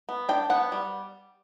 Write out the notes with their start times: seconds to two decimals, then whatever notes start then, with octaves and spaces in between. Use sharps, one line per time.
0.09 B3
0.29 D4 G5
0.50 B3 F#5
0.72 G3